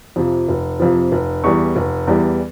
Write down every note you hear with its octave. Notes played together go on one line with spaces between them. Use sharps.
F2 C3 F3
F1
F2 C3 F3
F1
E2 E3 G3 C#6
F1
E2 E3 G3